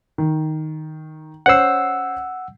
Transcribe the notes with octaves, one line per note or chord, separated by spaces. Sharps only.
D#3
C#4 C5 F#5 E6 C7